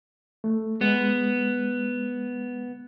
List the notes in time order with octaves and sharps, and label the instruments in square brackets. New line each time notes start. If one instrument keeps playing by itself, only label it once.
[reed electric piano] A3
[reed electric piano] G#3 [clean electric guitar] B3